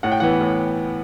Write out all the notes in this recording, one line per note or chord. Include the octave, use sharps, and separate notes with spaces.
A2 F#5
G5
E3 B3 F#5
A2